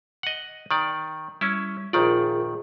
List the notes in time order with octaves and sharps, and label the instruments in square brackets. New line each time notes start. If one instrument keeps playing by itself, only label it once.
[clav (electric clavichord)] D#5 F#5
D#3 D5
[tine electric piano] G3 [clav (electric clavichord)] C#4 E4
[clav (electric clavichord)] A#1 D#3 D5 [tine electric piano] F4 G#4 A#4